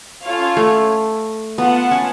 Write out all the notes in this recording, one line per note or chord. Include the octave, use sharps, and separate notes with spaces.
C#4 F4 A4 C#5 F5
A3
B3 F4 B4 F#5 A5
C#4